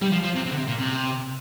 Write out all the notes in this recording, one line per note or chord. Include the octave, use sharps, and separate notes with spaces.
G3
F3
F3
C3
C3
D3
C3
A#2
C3